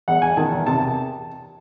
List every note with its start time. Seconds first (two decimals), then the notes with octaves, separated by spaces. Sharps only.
0.08 E2 F#5
0.22 E2 G#5
0.37 D#3 A5
0.52 E2
0.66 C3 A5